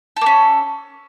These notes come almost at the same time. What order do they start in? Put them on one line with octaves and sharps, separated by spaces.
A4 A#3 C#4